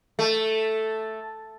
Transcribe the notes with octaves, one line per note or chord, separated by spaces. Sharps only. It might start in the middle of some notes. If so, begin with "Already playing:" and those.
A3